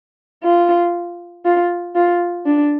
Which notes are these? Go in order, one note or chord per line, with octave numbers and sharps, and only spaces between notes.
F4
F4
F4
D4